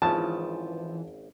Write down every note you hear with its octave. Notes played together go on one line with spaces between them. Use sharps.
G#1 C#3 E3 F3 A5